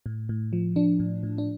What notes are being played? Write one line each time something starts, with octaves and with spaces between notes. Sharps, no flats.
A2
A2
F3
F3 D4
A2
A2
D4